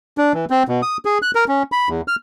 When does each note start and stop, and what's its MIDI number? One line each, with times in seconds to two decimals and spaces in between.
0.18 0.33 62
0.34 0.45 52
0.50 0.63 60
0.68 0.81 47
0.82 0.97 87
1.05 1.18 68
1.22 1.31 90
1.35 1.45 70
1.48 1.63 61
1.72 1.89 83
1.89 2.01 40
2.08 2.16 89